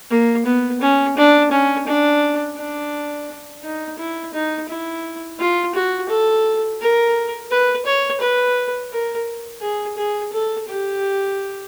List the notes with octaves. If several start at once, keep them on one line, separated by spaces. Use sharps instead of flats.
A#3
B3
C#4
D4
C#4
D4
D4
D#4
E4
D#4
E4
F4
F#4
A4
A#4
B4
C#5
B4
A#4
G#4
G#4
A4
G4